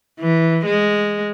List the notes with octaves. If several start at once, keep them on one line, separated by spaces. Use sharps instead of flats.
E3
G#3